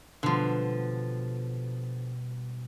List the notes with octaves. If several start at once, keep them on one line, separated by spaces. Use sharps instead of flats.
B2 D3 F3 G3